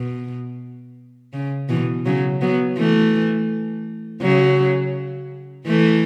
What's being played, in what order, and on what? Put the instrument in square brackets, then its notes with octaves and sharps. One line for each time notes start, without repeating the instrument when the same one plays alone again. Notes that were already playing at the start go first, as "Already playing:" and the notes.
Already playing: [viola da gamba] B2
C#3
B2 E3
C#3 F#3
F#3 B3
E3 A3
C#3 F#3
E3 A3